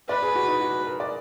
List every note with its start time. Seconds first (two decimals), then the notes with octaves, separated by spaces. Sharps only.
0.09 B4 D5
0.23 G#4
0.36 F#4
0.48 D#4
0.61 F#4
0.87 A#4
1.00 D5